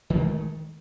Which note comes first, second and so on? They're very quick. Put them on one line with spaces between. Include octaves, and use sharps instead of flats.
D#3 G#3 A3